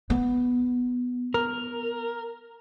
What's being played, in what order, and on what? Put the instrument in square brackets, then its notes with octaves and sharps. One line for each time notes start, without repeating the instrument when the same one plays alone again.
[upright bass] B3
[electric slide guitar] A#4